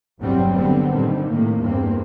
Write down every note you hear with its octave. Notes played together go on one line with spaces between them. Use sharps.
G1 E2 C3 F#3 G3 C4
D3 G3 B3 C4
A#2 D3 D#3 G3
A2 C3 A#3
E2 G2 A#3 C4